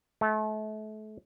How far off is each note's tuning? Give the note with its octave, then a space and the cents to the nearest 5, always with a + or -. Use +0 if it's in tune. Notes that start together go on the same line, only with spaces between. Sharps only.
A3 -35